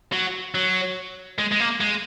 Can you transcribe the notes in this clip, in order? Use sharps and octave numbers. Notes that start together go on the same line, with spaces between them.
F#3
F#3
G#3
G#3
A#3
G#3